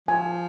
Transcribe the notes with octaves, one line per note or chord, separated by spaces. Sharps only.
F3 G#5